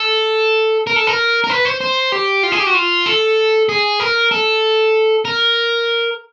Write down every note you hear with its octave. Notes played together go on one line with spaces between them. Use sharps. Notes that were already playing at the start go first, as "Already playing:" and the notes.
Already playing: A4
A#4
A4
A#4
A#4
B4
C5
C5
G4
F4
G#4
G4
F#4
F4
A4
G#4
A#4
A4
A#4